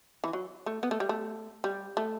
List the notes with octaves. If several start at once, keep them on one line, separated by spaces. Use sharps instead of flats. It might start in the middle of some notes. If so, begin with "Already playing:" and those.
E3
F#3
A3
B3
A3
G3
A3
G3
A3